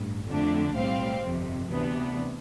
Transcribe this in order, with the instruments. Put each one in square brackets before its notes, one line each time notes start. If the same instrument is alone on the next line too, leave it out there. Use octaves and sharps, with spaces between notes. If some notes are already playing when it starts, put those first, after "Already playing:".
Already playing: [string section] A1 G2
F2 D3 A3 D4
B1 A2 G3 C4 F5
G1 F2 C3
D2 C3 E3 B3 D4